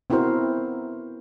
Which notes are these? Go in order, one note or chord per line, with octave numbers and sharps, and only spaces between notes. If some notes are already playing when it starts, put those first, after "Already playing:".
B3 C4 E4 F#4 A#4 C5